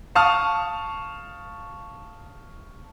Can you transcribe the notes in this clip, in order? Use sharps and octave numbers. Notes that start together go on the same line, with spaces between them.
F5 A5 C#6 D#6 F6